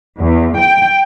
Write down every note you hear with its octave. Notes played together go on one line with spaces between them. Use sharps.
E2
G5